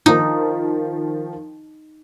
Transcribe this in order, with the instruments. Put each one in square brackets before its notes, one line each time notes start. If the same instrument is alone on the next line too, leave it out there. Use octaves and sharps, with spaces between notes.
[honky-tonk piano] D#3 F3 [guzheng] D#4